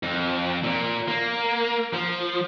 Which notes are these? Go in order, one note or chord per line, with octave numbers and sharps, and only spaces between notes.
F2
A#2
A#3
F3